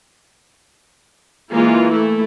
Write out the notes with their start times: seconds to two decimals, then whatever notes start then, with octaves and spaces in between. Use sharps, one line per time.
1.54 E3 G#3 A#3 F4
1.92 A3 E4